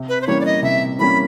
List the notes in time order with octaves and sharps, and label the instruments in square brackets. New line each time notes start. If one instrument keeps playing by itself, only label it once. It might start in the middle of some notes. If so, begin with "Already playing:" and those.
Already playing: [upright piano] C3
[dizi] B4
C5
[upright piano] E3 G3 A#3 C#4 [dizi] C#5
[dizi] D5
D#5
[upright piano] C3 [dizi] E5
[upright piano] E3 G3 A#3 C#4 [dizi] B5